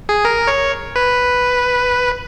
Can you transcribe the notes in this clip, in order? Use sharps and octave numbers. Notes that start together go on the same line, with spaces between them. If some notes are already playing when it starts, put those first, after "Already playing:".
G#4
A#4
C#5
B4